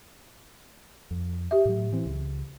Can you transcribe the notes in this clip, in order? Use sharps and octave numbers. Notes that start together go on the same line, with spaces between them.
F2
G4 E5
A2 F#3
E3 C4
C#2